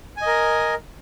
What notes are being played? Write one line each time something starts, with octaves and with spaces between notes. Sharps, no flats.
A#4 D#5 G#5